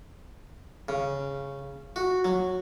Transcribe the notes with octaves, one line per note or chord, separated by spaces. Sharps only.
C#3
F#4
F#3